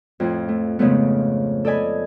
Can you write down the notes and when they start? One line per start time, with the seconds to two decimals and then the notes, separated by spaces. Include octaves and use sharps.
0.20 F2 A2 F3
0.48 A3
0.79 G#2 C#3 F3 A3 B3
1.65 A4 D5 D#5 G#5 B5